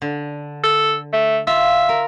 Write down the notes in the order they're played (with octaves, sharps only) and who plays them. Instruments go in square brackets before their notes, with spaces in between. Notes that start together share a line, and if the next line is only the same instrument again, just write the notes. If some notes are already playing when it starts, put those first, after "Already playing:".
[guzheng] D3
[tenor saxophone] A4
A3
[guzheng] F4 [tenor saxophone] E5
[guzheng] A#4